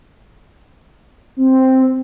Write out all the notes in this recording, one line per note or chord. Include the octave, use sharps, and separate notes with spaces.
C4